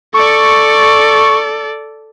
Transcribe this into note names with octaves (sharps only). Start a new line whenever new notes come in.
A4 D5 C#6